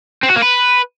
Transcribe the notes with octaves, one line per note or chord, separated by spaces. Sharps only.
C4
F#4
A#3
B4